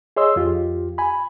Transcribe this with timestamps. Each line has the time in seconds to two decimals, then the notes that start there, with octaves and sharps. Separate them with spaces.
0.16 G#4 C#5 D#5 C6 E6
0.36 F2 F4 G4
0.98 G#5 B5